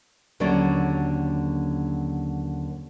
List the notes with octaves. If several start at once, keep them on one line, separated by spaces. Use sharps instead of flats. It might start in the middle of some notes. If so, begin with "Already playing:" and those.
D#2 D3 F#3 A#3 C#4 D5